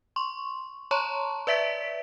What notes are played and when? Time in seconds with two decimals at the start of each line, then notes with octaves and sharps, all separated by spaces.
0.16 C6 C#6
0.91 C#5 A5 A#5 C6 C#6
1.47 B4 D5 E5 B6 D7